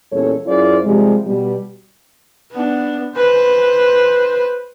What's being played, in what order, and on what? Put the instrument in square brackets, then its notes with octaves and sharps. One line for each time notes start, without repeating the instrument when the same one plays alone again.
[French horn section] E2 A#2 G3 C#4 A4 C#5
F#2 E4 F4 G#4 C5 D5
C3 F3 G3 G#3
B2 G3
[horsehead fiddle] B3 D4
B4 C5